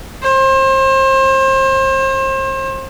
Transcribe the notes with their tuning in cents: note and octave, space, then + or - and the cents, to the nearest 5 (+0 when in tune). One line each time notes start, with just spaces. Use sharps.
C5 +35